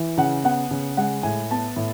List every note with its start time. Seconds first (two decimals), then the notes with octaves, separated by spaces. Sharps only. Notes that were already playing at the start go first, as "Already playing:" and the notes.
Already playing: E3
0.18 C#3 F#5
0.44 B3 F#5
0.71 C#3
0.97 G#3 F#5
1.23 A2 G#5
1.50 B3 A5
1.77 A2